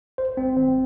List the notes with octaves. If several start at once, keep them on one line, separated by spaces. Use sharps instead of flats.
G#1 C5
G#1 C4
D#3 C4